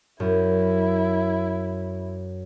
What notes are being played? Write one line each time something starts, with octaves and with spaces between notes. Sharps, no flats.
F#2 E4